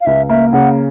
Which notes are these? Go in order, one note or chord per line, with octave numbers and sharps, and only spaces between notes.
F5
C#2 E5
A#3 E5
C#3 F#5